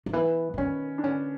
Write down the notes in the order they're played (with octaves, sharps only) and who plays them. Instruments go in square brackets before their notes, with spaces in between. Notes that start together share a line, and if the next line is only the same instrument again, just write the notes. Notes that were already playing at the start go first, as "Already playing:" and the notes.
[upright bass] D#3
[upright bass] E3 [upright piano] B3
[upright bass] D3
[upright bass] D#3 [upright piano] C#4
[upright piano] D4
[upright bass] D3 [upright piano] C#4